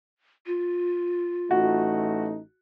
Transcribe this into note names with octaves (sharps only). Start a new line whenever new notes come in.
F4
A1 A3 D#4 F#4